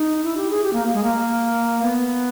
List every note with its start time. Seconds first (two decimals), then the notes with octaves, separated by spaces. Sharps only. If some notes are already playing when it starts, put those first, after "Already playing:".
Already playing: D#4
0.24 E4
0.37 G4
0.50 G#4
0.63 G4
0.73 A#3
0.93 G#3
1.03 A#3
1.82 B3